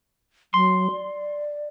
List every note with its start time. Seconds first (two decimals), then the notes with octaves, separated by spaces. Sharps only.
0.54 F#3 C6
0.92 D5